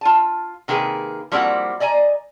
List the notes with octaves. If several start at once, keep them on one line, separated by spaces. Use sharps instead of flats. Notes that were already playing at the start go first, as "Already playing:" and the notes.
F4 A5
C3 D#3 A#3 G#4 B4
F3 G3 A#3 C4 E4 F#4
D5 D#5 G#5 A#5